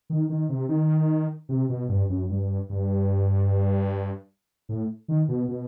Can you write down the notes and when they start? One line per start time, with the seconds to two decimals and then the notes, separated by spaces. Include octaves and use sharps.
0.10 D#3
0.30 D#3
0.49 C3
0.69 D#3
1.49 C3
1.69 B2
1.89 G2
2.10 F#2
2.30 G2
2.70 G2
4.69 A2
5.08 D#3
5.28 B2
5.48 B2